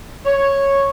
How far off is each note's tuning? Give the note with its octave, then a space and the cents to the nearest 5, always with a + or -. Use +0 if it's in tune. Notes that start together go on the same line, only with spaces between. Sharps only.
C#5 -5